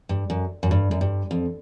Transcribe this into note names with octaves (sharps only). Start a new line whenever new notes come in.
G2
F#2
F#2
G2
F#2
G2
F2